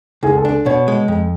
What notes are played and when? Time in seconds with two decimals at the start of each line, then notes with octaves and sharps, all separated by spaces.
0.23 C#2 G#4
0.38 A4
0.45 D4
0.66 B2 C#5
0.88 G#3
1.08 F2